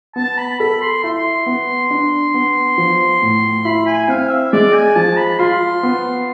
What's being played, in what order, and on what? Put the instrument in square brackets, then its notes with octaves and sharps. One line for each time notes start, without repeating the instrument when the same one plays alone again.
[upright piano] B3 [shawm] A5
[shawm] B5
[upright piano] A4 [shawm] B5
[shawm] C6
[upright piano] E4 [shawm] C6
[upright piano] B3
D4
B3
F3
A2
[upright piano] E4 [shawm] B5
[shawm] G#5
[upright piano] C4 [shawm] F5
[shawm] E5
[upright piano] G#3 [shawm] D5
[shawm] G#5
[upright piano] F3 [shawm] A5
[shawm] B5
[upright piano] F4 [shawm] C6
[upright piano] B3